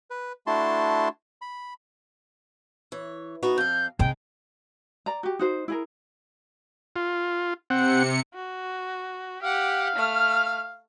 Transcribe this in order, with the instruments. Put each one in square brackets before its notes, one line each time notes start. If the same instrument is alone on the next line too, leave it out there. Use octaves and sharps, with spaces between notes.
[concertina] B4
A3 D4 E4 F#4 A5 C6
B5
[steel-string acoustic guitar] E3 C#5
B3 D#4 F#4
[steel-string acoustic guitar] F2 F5 [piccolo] G6
[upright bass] C3 [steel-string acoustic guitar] G#3 D#4 [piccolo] G5
[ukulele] D5 A#5
F#4 G4
D#4 F#4 C5
E4 G#4 A#4
[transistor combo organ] F4
[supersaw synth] C3 C#7 [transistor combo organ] C4 F#5
[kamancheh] F#4
[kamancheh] G4 F#5 [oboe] F5
[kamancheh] A3 F6